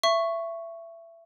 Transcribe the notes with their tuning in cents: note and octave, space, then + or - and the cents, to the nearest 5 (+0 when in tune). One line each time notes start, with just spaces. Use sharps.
E5 +20 C#6 +0